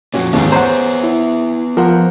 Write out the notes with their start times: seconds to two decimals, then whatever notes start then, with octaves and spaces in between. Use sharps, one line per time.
0.14 F2 A#2 C#4 F#4
0.33 D#2 G#2 E3 G#3 B3 C#4 G#4
0.52 C5 C#5 F#5 A#5
1.03 E4
1.77 F3 A#4 C5 F#5